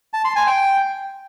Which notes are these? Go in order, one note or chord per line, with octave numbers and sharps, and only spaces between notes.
A5
C6
G#5
G5